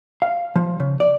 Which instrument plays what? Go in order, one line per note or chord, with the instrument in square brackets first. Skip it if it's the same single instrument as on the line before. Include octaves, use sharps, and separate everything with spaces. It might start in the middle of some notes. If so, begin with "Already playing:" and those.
[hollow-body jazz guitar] F5
F3
C#3
D5